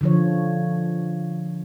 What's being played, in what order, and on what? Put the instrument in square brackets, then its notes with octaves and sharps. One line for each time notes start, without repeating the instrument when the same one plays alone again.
[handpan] D3 F3 C#5